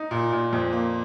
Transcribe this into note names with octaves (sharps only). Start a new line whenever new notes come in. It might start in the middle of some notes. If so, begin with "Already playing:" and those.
Already playing: D#4
A#2
A#2
F2
A#3